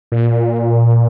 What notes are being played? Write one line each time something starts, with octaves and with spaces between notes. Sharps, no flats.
A#2